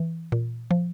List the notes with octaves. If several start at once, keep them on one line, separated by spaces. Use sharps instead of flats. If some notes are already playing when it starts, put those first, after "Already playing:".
Already playing: E3
A#2
F3